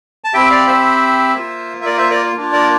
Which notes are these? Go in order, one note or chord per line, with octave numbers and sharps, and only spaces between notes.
A5
C4 E4 G4 E5 G5
D5 F5
C5 E5
A#3 F4
E5
A#4 D5
C5 E5
A#4 D5
A#3 D4 F4
A#4 D5